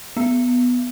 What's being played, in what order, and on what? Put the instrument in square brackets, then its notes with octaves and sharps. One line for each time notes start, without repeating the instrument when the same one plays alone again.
[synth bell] B3